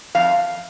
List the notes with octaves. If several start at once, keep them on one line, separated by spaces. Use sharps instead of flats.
F2 F5